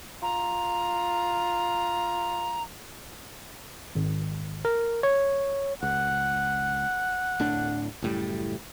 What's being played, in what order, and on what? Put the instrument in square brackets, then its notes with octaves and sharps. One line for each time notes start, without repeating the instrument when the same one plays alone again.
[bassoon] F4 [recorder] A#5
[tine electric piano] G#1
A#4
C#5
[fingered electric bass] C#2 [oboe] F#5
[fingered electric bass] D1 A2 D4
F#1 A2 G3